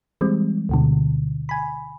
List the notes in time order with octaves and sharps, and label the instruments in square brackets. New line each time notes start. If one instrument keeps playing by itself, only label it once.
[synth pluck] E3 G3 G#3 C4
D2 B2 D3
G#5 B5